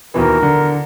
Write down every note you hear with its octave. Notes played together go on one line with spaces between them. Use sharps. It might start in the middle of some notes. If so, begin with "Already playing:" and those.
D#2 B2 E3 A#4
D3